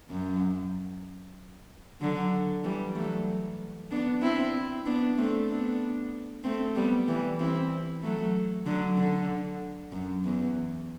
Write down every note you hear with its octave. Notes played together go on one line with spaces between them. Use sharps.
F#2
D3 F#3
E3 G3
F#3 A3
B3 D4
C4 E4
B3 D4
A3 C4
B3 D4
A3 C4
G3 B3
E3 G3
C4 E4
F#3 A3
D3 F#3
D3
F#2
E2